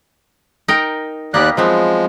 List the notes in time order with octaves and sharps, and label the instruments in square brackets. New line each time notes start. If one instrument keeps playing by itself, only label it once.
[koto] D#4 A#4 G5
[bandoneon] D#2 D5 F#6 [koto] A#3 B3 G4
[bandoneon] F3 G#3 [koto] F#3 B3 C4